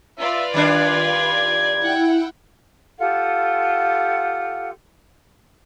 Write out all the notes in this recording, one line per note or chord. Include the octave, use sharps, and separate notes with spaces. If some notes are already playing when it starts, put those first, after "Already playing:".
F4 B4 D5 E5
D#3 G3 D4 G#6
E4 F#5 G5
F4 G4 A4 F#5